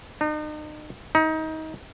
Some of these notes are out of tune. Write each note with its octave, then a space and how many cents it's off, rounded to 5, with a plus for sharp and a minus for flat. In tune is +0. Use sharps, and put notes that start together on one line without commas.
D#4 -40
D#4 +25